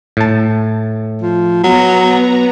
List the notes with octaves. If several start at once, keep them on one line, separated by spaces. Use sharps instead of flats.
A2 A5
F3
F#3 B3 A#5